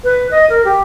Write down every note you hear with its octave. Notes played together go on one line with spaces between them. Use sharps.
B4
D#5
A#4
G4